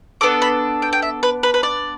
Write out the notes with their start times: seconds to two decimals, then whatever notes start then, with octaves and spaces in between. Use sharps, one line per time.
0.21 B3 D4 A4 D6
0.42 B5
0.82 G5
0.93 G5
1.02 E5
1.23 B4
1.43 B4
1.54 B4
1.63 D5